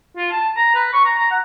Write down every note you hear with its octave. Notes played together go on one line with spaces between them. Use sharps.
F4
A5
A#5
B4
C#6
A#5
A#5
F#5